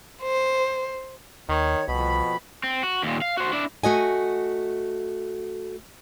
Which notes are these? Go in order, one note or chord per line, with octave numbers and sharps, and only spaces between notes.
C5
D#2 D#3 C#5
C2 F2 B2 B5
C4
F#4
D#2 A#2
F5
F#4 C5
D4 E4
A3 F#4 D#5 G#5